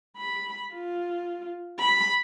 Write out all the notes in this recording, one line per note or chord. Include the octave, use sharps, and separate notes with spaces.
B5
F4
B5